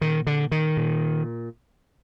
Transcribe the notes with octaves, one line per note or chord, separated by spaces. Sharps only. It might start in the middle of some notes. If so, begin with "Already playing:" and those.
A#2 D#3
D3
D#3
A#2